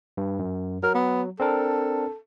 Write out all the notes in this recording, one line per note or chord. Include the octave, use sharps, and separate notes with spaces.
G2
F#2
F#3 A#4
B3
C4 D4 A4 A#4